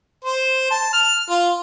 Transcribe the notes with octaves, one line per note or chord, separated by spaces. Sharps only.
C5
A5
F6
F4